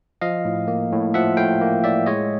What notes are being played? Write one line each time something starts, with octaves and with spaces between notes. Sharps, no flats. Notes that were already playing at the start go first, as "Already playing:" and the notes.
F3 D#5 F5
A2
A#3
A2
F3 E5 F#5
A2 F5 G5
A#3
A2 D5 E5
G#3 C#5 D#5